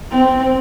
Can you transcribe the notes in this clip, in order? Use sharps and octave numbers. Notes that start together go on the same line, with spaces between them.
C4